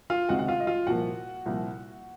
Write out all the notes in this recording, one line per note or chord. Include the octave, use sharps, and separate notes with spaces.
F4 F5
C#2 C3 D#3 G#3 C4 F#4 F#5
F#5
F4 F5
D#5
F4 F5
C2 A#2 F3 A#3 F#4 F#5
C2 A#2 F3 A#3